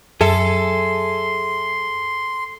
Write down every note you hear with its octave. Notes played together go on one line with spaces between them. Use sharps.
F#2 G#4 A4 E5 C6